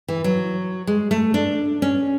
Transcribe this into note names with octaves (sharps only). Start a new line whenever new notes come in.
E3
F#3
G#3
A3
D4
C#4